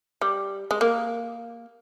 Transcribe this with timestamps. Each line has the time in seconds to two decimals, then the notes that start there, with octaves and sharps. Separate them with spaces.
0.21 G3
0.71 G#3
0.81 A#3